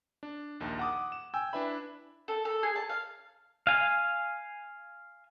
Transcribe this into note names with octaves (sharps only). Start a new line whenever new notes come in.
D4
A#1 D#2 D#3
F#5 D6 D#6
E7
G5 G#5 E6
D4 E4 B4 E5 B5
A4
A4
G#4
A5
F5
F5 G#5